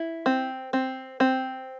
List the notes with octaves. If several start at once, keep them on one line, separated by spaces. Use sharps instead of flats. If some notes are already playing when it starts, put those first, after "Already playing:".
Already playing: E4
C4
C4
C4